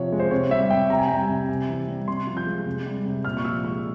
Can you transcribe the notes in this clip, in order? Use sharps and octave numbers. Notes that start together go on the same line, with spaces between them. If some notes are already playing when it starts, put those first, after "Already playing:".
Already playing: C3 F3 C#5
G#3
C5
C3 C#5
G3 E5
C3 G5
C3 A#5
G#5
G3 G5
G#5
C3
C3
E3
G3
C3 C6
F3
G6
G#3
C3
G3
C3
A#2 F6
C#6
F3 E6
G#3 C#6